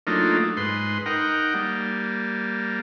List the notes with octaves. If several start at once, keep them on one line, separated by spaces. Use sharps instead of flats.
F#3 A3 A#3 D4 D#4 F4
G#2 B4 C6
D#4 A#4 F#5 G5
G3 A#3